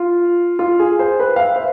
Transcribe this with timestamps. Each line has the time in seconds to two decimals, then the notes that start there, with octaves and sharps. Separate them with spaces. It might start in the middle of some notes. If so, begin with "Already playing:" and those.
Already playing: F4
0.59 F4
0.80 G#4
0.99 C5
1.20 B4
1.36 F5
1.40 E5
1.56 C5